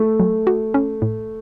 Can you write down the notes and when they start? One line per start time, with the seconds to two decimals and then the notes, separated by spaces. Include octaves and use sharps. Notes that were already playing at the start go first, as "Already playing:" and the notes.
Already playing: A3
0.20 F#3
0.47 F#4
0.74 C#4
1.02 A2